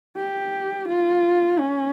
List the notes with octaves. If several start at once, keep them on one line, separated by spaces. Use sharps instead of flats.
G4
F4
C#4